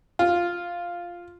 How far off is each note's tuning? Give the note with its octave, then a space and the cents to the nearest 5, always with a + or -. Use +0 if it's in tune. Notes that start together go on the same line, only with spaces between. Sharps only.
F4 +0